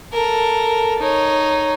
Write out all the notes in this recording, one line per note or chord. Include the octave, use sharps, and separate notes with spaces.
A4 A#4
D#4 C#5